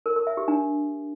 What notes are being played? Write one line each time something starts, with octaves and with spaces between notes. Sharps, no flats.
A#4
A#4
E5
G4
D4